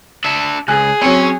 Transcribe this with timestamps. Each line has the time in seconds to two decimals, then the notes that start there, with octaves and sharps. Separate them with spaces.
0.24 D4 E5
0.68 C#2 G#4 G#5 F#6
1.02 F#3 C4 C#4 C#5